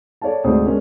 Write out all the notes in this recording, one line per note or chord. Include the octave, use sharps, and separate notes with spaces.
A4 C#5 D5 F5 A5
D2 G#2 C3 C5 D5 D#6
G#3 A#3 C#4 D4